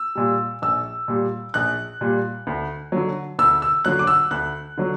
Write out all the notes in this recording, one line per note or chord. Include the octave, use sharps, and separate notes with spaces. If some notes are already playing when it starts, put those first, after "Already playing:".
Already playing: E6
A#2 G3
A#1 E6
A#2 G3
A#1 F#6
A#2 G3
D2
D3 F#3
D2 E6
E6
D3 F#3 F#6
D6
E6
D2 F#6
D3 F#3